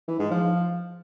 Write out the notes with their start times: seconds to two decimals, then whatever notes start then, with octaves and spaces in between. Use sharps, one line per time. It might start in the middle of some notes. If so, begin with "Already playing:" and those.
0.08 E3
0.19 G#2
0.31 F3